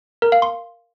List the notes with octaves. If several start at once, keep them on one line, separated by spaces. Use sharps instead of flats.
A#4
F5
C6